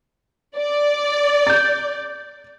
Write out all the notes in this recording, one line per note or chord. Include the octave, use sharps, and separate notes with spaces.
D5
G6 A6